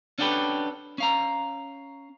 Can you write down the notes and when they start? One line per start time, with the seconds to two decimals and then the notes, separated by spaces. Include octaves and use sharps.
0.18 C#4 D4 F#4 G4 A4 B4
0.98 C#4 F5 A#5